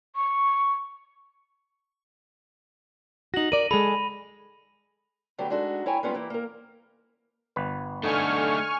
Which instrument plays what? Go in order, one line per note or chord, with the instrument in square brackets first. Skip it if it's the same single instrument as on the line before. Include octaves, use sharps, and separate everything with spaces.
[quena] C#6
[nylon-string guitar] D#4 F#4 [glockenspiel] A#6 F#7
[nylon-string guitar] A#4 D5 [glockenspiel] D#7
[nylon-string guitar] G#3 G#4 A4 [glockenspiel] B5
[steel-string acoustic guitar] D3 F#3 G3 A3 B3 G4
G#3 D4 D#4 F#4 A4
E4 C#5 G5 G#5 A#5
G3 G#3 B3 C#4 D#4 F4
E3 A#3 E4
A#3 A#4
[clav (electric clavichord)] G1 B4
[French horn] D3 [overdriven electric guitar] A3 D#4 [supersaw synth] G#5 C#6 F6